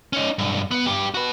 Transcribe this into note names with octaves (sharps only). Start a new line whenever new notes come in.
C#4 D#4
B1 G2
B3
G2 G4
F#4 B4